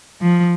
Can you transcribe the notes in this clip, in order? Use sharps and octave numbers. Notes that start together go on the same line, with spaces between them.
F3